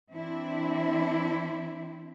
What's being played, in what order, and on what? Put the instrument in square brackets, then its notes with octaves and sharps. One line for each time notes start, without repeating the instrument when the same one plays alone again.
[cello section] E3 C4 D4 E4